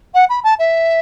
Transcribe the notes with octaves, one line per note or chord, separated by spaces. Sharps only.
F#5
B5
A5
E5